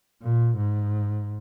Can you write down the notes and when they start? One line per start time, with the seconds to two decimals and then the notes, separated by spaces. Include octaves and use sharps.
0.23 A#2
0.57 G#2